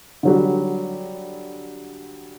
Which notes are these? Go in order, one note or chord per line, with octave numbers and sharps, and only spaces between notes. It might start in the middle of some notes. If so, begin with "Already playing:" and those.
D3 F#3 G3